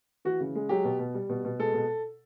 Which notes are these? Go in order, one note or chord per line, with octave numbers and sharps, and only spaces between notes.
E3 F#4
C#3
G#3
F#3 G4
B2
B2
G3
B2
B2
G#3 A4
B2